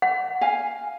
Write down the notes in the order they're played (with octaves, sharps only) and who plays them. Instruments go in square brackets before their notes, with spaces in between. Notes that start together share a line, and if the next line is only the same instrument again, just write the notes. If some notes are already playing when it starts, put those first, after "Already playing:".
[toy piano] F#5
[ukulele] F5 G#5